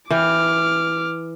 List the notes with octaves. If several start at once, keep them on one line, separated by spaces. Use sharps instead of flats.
E3 G5 D6 F6